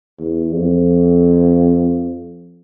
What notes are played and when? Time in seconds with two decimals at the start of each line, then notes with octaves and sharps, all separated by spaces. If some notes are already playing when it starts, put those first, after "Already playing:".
0.20 E2
0.52 F2